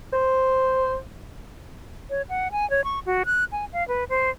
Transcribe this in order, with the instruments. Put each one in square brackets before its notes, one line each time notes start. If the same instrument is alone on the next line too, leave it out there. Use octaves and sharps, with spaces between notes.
[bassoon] C5
[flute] C#5
F#5
G#5
C#5
C#6
F#4
F#6
G#5
F5
B4
C5